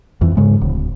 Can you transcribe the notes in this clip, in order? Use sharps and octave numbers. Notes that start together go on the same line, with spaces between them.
F2 E3
G#2 C#3 G#3
D1